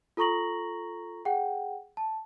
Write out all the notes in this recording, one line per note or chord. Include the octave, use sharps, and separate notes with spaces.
F4 A4 A#5 C#6 A#6 F#7
G#4 F#5 G5
A5